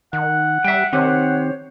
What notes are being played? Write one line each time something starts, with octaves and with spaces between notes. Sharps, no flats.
D#3 F#5
G3 E5 G5
D#3 C4 G4 C5 C#5